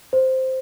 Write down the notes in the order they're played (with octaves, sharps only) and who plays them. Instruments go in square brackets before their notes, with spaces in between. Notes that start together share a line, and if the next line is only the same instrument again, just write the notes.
[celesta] C5